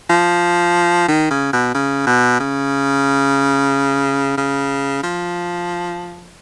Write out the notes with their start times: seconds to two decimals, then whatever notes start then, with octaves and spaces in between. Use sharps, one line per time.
0.10 F3
1.08 D#3
1.30 C#3
1.53 B2
1.74 C#3
2.07 B2
2.40 C#3
4.37 C#3
5.03 F3